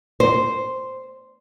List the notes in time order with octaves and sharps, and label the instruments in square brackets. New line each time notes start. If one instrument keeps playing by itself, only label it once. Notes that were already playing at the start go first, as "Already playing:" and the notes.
[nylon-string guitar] C5